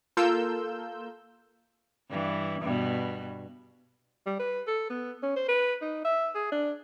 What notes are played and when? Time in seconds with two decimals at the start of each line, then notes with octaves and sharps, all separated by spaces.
0.17 A#3 F4 A4 A#4 E6 G6
2.09 G2 E3
2.62 G2 B2
4.26 G3
4.39 B4
4.67 A4
4.90 B3
5.23 C#4
5.36 C5
5.49 B4
5.82 D#4
6.05 E5
6.35 G#4
6.52 D4